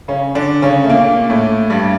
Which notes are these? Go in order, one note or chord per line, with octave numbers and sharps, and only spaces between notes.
C#3 C#4
D3 D4
C#3 C#4
A3
A#2 A#3
A2 A3
G2 G3